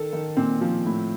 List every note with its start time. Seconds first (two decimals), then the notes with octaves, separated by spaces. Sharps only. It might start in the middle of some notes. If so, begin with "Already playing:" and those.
Already playing: D#3 A4
0.13 D#3
0.37 A#2 C4
0.61 F3
0.86 A2